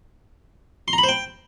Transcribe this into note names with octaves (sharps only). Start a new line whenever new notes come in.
C6
A#5
B5
C5
G5